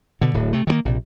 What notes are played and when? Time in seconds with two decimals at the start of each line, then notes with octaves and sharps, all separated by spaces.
0.21 B2 D3
0.34 D1 A2
0.53 C3 A3
0.67 D#3 F3 A#3
0.85 A#1 C3